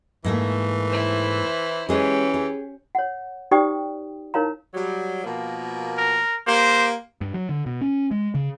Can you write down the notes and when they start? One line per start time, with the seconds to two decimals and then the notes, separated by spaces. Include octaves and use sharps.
0.24 G#2 E3 A3 A#3
0.89 E4 C5
1.89 E3 G#3 C#4 G4 G#4
2.34 G#4
2.95 C#5 F#5
3.51 D#4 G4 C5 D5 G5 D#6
4.34 D#4 E4 A#4 C#5 F5 A#5
4.74 F#3 G3
5.24 B2 F3 A#3
5.98 A#4
6.47 A#3 G4 C5
7.21 G2
7.34 F#3
7.49 D3
7.66 B2
7.81 C#4
8.11 G#3
8.35 C#3